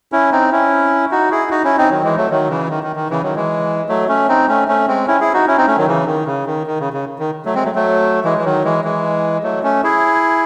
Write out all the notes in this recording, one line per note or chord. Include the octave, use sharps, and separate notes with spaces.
C#4 E4
C4 D#4
C#4 E4
D#4 F#4
E4 G#4
D#4 F#4
C#4 E4
C4 D#4
D#3 F#3
E3 G#3
F#3 A3
D#3 F#3
C#3 E3
D#3
D#3
D#3
C#3 E3
D#3 F#3
E3 G#3
F#3 A3
A3 C#4
C4 D#4
A3 C#4
A3 C#4
G#3 C4
C#4 E4
E4 G#4
D#4 F#4
C#4 E4
C4 D#4
A3 C#4
D#3 F#3
C#3 E3
D#3
C#3
D#3
D#3
C#3
C#3
D#3
F#3 A3
G#3 C4
F#3 A3
F#3 A3
E3 G#3
E3
D#3 F#3
E3 G#3
E3 G#3
F#3 A3
A3 C#4
E4 G#4